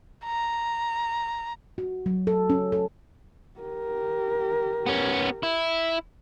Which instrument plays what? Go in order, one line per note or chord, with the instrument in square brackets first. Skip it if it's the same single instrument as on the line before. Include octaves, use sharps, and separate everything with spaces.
[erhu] A#5
[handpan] F#4
F#3
A4
C#4
A4
[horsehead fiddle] G4 A#4
[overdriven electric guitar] B3 C#4
E4